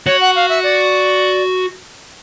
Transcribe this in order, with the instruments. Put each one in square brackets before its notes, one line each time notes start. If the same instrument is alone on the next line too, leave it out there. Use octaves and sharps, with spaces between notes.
[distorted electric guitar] F#4 [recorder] C#5
[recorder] F#5
F5
E5
D5